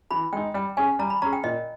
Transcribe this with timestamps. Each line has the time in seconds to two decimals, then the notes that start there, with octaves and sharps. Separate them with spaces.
0.11 E3 B5
0.33 G#3 G5
0.37 D#4
0.54 G3 G5
0.77 C#4 G#4 G#5
0.99 G3 A#5
1.10 B5
1.22 C#4 G#4 A#5
1.33 G5
1.44 A#2 D#5